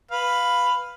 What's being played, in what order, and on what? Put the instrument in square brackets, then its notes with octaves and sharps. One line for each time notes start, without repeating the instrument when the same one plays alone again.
[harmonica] B4 F5